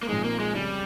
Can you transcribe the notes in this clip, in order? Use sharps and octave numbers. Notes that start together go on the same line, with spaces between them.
A#3
A#2 F3 G#3 C4 D#4
A#3
G#3
F2 C#3 G3 G#3